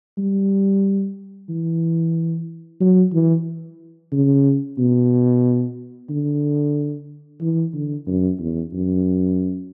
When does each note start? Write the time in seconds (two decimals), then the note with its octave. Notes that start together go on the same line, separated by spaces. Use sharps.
0.18 G3
1.49 E3
2.80 F#3
3.13 E3
4.12 C#3
4.78 B2
6.09 D3
7.41 E3
7.74 D3
8.06 F#2
8.39 E2
8.73 F#2